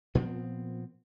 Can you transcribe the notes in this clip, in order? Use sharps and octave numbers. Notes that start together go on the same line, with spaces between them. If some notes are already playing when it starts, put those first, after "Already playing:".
A#2 F3 B3 C4